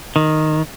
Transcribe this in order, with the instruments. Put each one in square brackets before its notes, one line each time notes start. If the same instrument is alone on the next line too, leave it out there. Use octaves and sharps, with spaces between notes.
[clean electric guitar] D#3